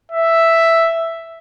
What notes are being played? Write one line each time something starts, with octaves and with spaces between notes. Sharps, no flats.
E5